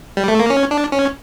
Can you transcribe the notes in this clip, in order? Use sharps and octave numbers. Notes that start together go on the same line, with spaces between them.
G3
A3
A#3
C#4
D4
C#4